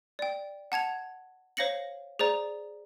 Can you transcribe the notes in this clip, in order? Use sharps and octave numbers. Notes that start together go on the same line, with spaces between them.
D5 G5
F#5 A5 G#6 F7
C5 C#5 F5 A#6 C#7 F#7
G#4 C5 D5 A#5